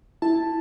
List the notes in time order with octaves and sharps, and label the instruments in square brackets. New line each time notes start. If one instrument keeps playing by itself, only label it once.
[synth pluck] E4 A5